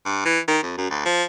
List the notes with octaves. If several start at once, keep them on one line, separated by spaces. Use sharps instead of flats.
G2
E3
D#3
F2
F#2
D2
F3